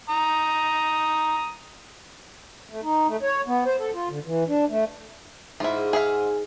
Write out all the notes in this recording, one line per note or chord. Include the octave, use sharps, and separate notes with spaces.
A#5 D#6
A3
D#4
A3
C#5
B3
C5
A4
F4
D3
E3
D4
A3
G#2 E4 F4
G#4 E5 F5